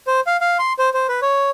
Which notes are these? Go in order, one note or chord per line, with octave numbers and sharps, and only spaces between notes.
C5
F5
F5
C6
C5
C5
B4
C#5